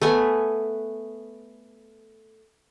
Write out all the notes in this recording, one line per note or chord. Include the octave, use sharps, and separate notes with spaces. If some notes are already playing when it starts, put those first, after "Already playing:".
A3 B3 G#5